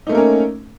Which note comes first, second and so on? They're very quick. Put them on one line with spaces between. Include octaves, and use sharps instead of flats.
D#4 A3 A#3 A#4 C#4